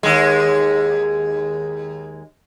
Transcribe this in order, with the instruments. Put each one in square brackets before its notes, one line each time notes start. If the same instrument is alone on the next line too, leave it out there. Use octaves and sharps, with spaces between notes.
[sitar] D#2 G#3